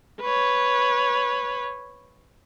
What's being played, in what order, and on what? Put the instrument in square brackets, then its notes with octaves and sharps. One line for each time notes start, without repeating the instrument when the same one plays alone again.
[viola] B4 C#5